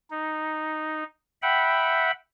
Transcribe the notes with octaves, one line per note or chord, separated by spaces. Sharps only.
D#4
E5 F#5 G5 B5